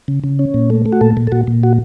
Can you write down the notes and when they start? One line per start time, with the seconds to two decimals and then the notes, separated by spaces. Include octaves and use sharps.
0.08 C#3
0.24 C#3
0.39 C#4
0.54 A#2
0.70 A3
0.86 A3
0.93 F#4
1.01 A#2 A4
1.17 A#2
1.27 A4
1.32 A#2 F#4
1.47 A#2
1.63 F#4